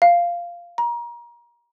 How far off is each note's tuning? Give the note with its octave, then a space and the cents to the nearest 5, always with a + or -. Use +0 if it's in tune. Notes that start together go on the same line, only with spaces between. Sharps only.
F5 -10
A#5 +30